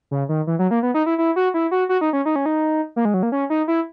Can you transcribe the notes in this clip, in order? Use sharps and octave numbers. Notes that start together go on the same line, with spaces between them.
C#3
D#3
E3
F#3
A#3
B3
D#4
E4
E4
F#4
E4
F#4
F#4
D#4
C#4
D#4
C#4
D#4
A#3
G#3
F#3
A#3
C#4
D#4
E4